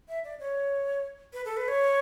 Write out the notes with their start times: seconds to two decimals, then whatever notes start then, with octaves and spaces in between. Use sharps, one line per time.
0.08 E5
0.24 D5
0.39 C#5
1.33 B4
1.45 A4
1.57 B4
1.68 C#5